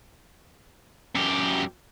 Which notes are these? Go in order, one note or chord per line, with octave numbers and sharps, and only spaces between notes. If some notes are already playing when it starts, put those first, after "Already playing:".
F#2 G4